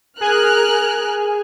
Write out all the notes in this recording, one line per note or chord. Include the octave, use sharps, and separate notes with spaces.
G#4 A#4 G#5 F6 F#6